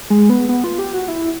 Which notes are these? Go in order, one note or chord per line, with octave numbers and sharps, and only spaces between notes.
G#3
B3
B3
F4
G4
F#4
E4